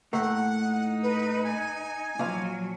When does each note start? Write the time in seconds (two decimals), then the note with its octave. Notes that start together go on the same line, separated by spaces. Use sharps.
0.13 A2 A3 A#3 F#5
0.61 D#4
1.03 B4
1.44 G#5
2.19 A#2 F3 F#3 F5